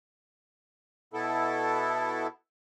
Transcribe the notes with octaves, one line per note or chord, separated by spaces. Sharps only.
B2 B3 E4 A4